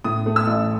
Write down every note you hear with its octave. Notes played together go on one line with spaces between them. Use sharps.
A2 D#6
A3
E6
A1